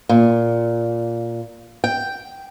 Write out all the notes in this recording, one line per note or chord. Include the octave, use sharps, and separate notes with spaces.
A#2
G5